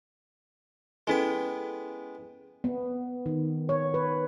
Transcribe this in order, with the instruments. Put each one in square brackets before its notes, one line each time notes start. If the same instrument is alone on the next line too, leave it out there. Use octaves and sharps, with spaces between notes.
[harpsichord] G#3 B3 G5 [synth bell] C#4 E4 A4
[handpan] B3
D#3
C#5
B4